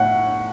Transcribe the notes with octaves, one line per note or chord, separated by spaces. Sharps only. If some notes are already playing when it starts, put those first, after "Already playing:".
Already playing: A2 F#5